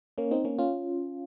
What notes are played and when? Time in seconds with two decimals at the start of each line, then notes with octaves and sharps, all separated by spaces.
0.18 A#3 C#4
0.31 C4 D#4
0.44 A#3 C#4
0.59 C#4 F4